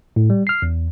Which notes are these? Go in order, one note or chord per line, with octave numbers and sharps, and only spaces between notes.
A2
G3
F6 C7
E2